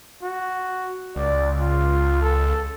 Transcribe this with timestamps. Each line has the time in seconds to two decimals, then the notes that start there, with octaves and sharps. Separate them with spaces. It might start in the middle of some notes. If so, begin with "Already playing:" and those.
0.22 F#4
1.16 C#2 D5
1.60 F4
2.22 A4